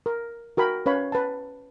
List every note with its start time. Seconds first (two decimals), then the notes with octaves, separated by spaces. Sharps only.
0.06 A#4
0.57 F#4 A#4 G5 B5
0.86 C#4 B4 C#5 F5 B5
1.12 B4 A5